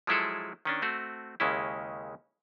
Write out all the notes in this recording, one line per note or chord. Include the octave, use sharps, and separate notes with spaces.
F3 F#3 G#3 E4 G#4 A4
D#3 C#4 D4
A3 C4 F#4
D#2 C#3 G#3 C#4 E4